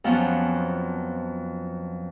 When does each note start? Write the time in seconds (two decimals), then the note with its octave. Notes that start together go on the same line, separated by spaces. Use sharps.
0.04 F2 F3 F#3 B3 C#4